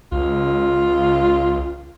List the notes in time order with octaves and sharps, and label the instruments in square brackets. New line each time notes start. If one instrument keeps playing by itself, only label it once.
[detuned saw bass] C#2 [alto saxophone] F4